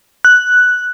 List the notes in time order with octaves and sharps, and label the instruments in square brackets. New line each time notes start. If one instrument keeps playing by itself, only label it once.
[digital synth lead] F#6